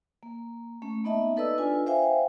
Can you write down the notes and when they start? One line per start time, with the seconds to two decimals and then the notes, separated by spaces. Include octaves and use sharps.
0.23 A#3
0.82 A3 C#4
1.04 A#3 B3 D#4 D#5 E5 A5
1.36 D#4 A4 B4 D5 D#5 E6
1.58 D4 F4 B4 G#5
1.86 C5 E5 F5 G5 G#5